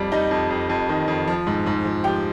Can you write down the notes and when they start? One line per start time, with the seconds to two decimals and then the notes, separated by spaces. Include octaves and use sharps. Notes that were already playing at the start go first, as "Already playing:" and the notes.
Already playing: F2 G3 D5
0.12 G3 D#4 D#5
0.31 F2
0.50 F2
0.69 F2
0.89 D#3
1.08 F2
1.27 F3
1.47 G#2
1.66 G#2
1.85 F3
2.04 F3 G4 G5